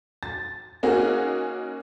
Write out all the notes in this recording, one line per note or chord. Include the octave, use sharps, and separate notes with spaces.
A6
A#3 C#4 D#4 F#4 G#4